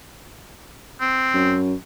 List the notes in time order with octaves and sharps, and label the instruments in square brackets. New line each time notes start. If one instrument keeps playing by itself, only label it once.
[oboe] C4
[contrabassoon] F#2